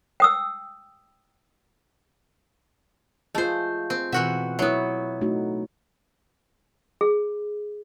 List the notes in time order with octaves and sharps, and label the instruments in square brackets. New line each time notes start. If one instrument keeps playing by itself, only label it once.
[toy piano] G5 D#6 E6
[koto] A3 C5 [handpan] F4 G#4 D#5
[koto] C4
[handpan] B2 C4 F#5 [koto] E3 F#4 E5
[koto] F#3 B3 [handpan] E4 C#5 E5
[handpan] A3 D#4 F#4
[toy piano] G#4